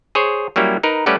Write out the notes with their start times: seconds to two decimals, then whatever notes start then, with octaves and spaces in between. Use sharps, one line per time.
0.15 G#4 C5 C#5
0.56 F#3 G3 A#3 C#4 E4
0.83 D#4 A#4 B4
1.06 G3 A3 C#4 B4 D5 F#5